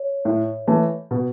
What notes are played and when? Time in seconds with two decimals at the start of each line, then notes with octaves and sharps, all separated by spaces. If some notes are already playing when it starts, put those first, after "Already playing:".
Already playing: C#5
0.25 A2
0.67 E3 A3
1.11 B2